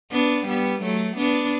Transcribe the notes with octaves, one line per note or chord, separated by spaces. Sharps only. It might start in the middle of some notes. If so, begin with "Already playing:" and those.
B3 D4
G3 B3
F#3 A3
B3 D4